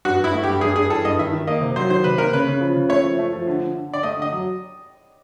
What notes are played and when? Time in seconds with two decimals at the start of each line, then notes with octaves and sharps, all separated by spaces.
0.05 G2 F#4
0.19 G2 E4
0.33 A3
0.43 G2 G4
0.61 G2 G#4
0.76 G2 G#4
0.90 E3 A4
1.05 G2 D#5
1.19 D#3 E5
1.33 D#3
1.47 A#3 D#5
1.61 C3
1.76 F#3 C5
1.90 D#3 C5
2.04 C3 B4
2.18 A#3 A#4
2.33 C#3 B4
2.47 C#3
2.61 F3
2.75 C#3
2.89 A3 C#5
3.04 F3
3.19 A3
3.33 F3
3.47 D3
3.61 D3
3.75 D3
3.89 D3 D5
4.03 A3 D#5
4.17 D3 D#5
4.33 F#3